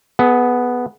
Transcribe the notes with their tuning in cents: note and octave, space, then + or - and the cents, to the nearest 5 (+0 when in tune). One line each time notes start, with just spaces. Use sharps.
B3 +0 G#4 +35